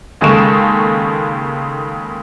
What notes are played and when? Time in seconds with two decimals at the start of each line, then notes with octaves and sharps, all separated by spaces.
0.21 D#2 C#3 G#3 A4 C#6 E7